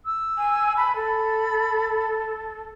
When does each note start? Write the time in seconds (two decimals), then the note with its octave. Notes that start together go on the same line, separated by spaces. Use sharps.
0.05 E6
0.38 G#5
0.77 A5 B5
0.96 A4 B5